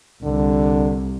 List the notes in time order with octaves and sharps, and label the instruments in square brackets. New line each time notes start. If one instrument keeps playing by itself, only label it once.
[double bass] C2 [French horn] D3